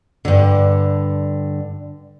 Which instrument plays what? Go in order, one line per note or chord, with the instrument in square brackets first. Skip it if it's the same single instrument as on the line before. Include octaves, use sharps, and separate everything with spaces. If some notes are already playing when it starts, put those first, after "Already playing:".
[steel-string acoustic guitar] G2 D3